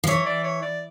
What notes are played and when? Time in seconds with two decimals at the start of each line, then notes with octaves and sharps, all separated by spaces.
0.04 F3
0.07 E3 C#5
0.26 D5
0.44 C#5
0.63 D5